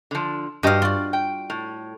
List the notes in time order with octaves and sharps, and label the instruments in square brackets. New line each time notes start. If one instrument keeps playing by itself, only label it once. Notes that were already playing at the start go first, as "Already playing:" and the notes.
[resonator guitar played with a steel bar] D3 F3
[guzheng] G2 F5 [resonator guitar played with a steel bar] F#4 G4 D#5
[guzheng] F4 F#4 [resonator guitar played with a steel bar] D5
[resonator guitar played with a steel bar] G5
A2